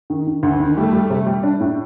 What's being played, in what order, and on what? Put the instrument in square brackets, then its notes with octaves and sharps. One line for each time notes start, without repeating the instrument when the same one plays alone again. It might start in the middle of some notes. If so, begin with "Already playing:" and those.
[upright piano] D#3
D#3
D2
D#3
[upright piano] G3 [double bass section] A3
[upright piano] G3
C3
G3
D4
A2